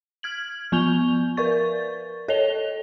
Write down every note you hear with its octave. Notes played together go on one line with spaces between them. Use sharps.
F6 G#6 F#7
F3 B3 C#6 G6 F7 G7
A#4 B4 D5 C#6 A6
A4 C#5 D#5 F7 G7